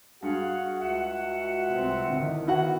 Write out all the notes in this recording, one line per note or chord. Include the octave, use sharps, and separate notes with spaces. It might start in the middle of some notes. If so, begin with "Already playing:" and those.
G2 F#4 G#4 F5 F#5
C#2 E5 F#5
F#4
C2 C4
D3 D#3 E4
B3 E4 F#4 F#5